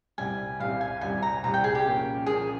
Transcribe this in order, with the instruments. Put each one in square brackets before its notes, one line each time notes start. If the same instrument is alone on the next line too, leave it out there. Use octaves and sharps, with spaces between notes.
[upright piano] C2 C3 G3 [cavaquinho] G#5
[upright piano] C2 C3 G3 [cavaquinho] F5
[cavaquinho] G#5
[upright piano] C2 C3 G3 [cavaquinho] G#5
[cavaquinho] A#5
[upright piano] C2 C3 G3 [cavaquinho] A#5
[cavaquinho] G5
G#4
G4
[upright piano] A#2 F3 A#3 C#4
[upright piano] A#2 F3 A#3 C#4 [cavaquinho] G#4